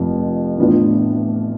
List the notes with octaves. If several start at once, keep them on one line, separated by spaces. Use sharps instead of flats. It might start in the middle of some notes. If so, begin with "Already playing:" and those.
Already playing: F1 F2
A2 E3 B3 D4 F4